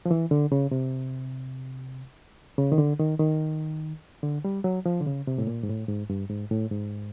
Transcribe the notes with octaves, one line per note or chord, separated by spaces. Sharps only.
F3
E3
D3
C#3
C3
C#3
D#3
D3
D#3
D#3
D3
G3
F#3
F3
D3
C#3
C3
A2
A#2
G#2
A2
G#2
G2
G#2
A2
G#2